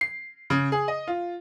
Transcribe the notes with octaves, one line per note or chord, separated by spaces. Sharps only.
C7
C#3
G#4
D#5
F4